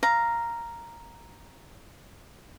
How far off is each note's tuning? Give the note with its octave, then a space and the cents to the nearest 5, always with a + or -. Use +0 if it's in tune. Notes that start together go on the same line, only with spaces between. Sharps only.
F5 -10 A#5 +0